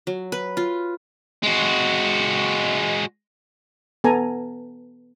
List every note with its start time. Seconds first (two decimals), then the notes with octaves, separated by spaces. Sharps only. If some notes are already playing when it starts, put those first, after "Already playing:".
0.07 F#3
0.32 B4
0.57 F4
1.43 G#3 F#4
4.04 B3 A4 G#5 A#5